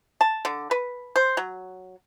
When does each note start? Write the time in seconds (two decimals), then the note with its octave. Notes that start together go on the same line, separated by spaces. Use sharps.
0.21 A5
0.45 D3
0.71 B4
1.16 C5
1.37 F#3